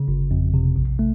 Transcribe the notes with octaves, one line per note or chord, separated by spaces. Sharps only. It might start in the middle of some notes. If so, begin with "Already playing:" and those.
Already playing: C#3
G1
F2
C3
A#1
A3